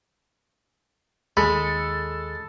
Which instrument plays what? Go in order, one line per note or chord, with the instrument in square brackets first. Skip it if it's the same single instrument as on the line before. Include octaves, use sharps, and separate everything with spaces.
[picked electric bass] D#2 D#3 [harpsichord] G#3 [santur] A4 [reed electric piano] B5